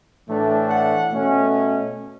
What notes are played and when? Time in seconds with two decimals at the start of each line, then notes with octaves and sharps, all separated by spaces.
0.28 A2 E3 A3 D4
0.70 F#5
1.11 B2 A3 C#4